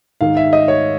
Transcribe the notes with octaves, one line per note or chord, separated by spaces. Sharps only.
G#2 D#3 F5
E5
D#5
C#5